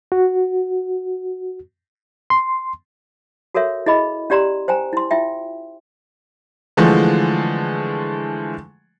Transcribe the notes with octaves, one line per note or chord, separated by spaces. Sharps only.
F#4
C6
F#4 A4 A#4 C#5 E5
E4 G#4 D#5 B5
C#4 G4 D5 A#5 C6
C5 G5 G#5 A#5
E4 C6
E4 F4 E5 G5
D3 E3 F3 G#3 A3